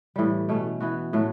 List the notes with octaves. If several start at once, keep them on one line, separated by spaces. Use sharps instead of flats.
A2 E3 G3
B2 A3 C#4
E3 B3 F#4
A2 F#3 A3